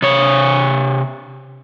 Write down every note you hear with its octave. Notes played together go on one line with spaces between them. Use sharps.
C3 C#5